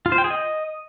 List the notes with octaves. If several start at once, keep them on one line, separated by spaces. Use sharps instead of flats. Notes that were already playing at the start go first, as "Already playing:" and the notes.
F4
C5
G5
G#4
D#5